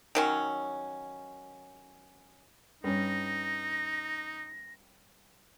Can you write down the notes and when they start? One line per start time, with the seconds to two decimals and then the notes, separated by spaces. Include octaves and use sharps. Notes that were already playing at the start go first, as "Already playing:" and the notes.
0.15 D#3 F#3 C#4
2.84 G2 C#4 D#4 A#6